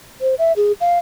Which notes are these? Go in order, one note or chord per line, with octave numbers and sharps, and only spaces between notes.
C5
E5
G#4
F5